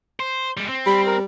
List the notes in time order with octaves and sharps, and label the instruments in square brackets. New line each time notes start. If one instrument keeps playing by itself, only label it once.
[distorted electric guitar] C5
G3 G#3
C4
[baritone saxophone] G3 [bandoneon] B5
[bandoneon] A#4